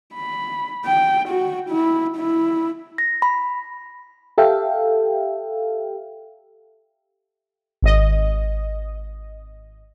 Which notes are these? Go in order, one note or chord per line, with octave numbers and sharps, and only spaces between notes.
B5
G5
F#4
E4
E4
A#6
B5
G4 A4 E5 F5 G5
G#1 D#5